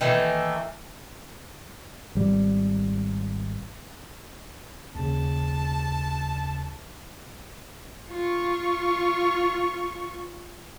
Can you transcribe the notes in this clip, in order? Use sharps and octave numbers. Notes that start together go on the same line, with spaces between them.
D#3 E3 A3 A#3
G#1 G3
D#2 C#3 A5
F4 C#6